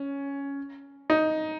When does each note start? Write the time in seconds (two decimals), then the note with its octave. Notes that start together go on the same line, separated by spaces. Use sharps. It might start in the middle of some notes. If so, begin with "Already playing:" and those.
Already playing: C#4
1.10 D#4